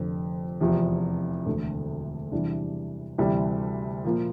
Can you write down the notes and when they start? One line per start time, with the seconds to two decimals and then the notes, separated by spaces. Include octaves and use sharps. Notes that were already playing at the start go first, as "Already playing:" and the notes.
Already playing: F1 F2 D3 F3
0.61 F1 E2 C3 F3
1.46 E1 D2 D3 A3
2.32 E2 C3 E3 G3 D4
3.18 D2 C3 E3 G3
4.05 A#2 F3 A#3 F4